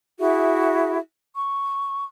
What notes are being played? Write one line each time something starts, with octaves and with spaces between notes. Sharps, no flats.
E4 F#4 G#4 E5
C#6